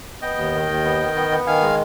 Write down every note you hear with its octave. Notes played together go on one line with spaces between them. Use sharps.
B3 D#5 G5
D#2
D#3
D#2
B3
D#3
B3
B3
D#3 F5 G#5
G#3